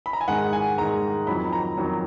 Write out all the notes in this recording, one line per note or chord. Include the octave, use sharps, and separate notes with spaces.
B5
A#5
G#5
G#2 D#3 G#3 F#5
G#5
G#2 D#3 G#3 A#5
F2 D#3 F#3 B5
A#5
F2 D#3 F#3